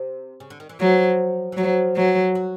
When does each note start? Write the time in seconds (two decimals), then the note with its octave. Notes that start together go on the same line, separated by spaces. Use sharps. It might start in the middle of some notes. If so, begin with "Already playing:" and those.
Already playing: C3
0.40 C#3
0.50 D3
0.60 D#3
0.69 E3
0.80 F3 F#3
1.52 E3
1.57 F3 F#3
1.96 F#3
2.35 F#3